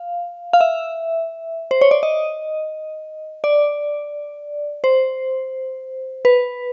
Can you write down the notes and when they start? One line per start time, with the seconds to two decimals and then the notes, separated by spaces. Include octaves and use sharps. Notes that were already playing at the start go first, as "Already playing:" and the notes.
Already playing: F5
0.53 F5
0.61 E5
1.71 C5
1.81 C#5
1.91 D5
2.03 D#5
3.44 D5
4.84 C5
6.25 B4